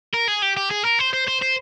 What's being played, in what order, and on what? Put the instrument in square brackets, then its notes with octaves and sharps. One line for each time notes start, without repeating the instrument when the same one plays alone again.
[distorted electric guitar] A#4
G#4
G4
G4
G#4
A#4
C5
C5
C5
C5